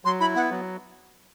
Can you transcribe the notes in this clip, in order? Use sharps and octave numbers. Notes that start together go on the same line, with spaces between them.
F#3 C6
E4 B5
B3 F#5
F#3